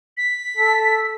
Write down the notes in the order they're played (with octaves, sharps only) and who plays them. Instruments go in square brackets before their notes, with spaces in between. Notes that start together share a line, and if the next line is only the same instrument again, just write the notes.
[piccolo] B6
[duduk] A4